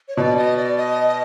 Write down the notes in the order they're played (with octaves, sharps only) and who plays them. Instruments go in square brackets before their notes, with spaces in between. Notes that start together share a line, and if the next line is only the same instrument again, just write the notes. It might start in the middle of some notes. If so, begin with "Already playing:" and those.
[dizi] C#5
[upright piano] B2 [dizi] D5
[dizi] D#5
D5
D#5
D#5